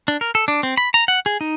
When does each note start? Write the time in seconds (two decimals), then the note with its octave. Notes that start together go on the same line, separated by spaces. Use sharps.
0.08 D4
0.21 A#4
0.35 A4
0.48 D4
0.63 C4
0.77 B5
0.94 A#5
1.08 F#5
1.26 G#4
1.41 D#4